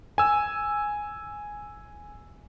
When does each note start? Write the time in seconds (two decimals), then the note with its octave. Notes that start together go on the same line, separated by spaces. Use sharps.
0.18 G#5 E6